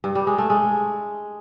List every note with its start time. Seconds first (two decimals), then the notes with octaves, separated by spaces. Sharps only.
0.04 G2
0.15 G3
0.27 G#3
0.38 A3
0.50 G#3